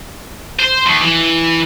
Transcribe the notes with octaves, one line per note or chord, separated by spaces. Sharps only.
C5
D#2
E3